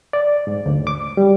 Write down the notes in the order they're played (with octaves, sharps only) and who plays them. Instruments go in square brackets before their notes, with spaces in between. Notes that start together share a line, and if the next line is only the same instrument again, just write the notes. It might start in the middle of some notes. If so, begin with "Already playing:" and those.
[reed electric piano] D5
G#2
D2
D6
G3